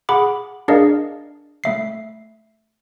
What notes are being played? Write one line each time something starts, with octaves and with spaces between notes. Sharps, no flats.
G#4 F#5 B5 D6
D4 G#4 A#4 D5 D#5 F5
A3 E5 C7